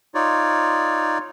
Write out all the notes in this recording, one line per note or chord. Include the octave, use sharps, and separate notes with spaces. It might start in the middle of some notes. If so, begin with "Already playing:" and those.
D#4 F4 C#5 D5